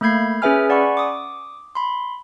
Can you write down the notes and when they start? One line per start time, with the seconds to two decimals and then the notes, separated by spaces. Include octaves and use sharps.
0.01 A3 A#3 B5 G6 G#6 C7
0.42 C#4 G#4 B4 E5 G#5 F6
0.70 D5 F#5 G#5 B5 C#6
0.97 D6 D#6
1.75 B5 C6